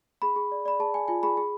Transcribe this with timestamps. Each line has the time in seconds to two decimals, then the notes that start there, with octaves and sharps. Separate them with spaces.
0.22 G#4 B5
0.36 G#4
0.52 D5
0.65 D5 B5
0.80 G#4 A5
0.94 G#4 G#5
1.08 F4 G#5
1.23 G#4 B5
1.37 G#4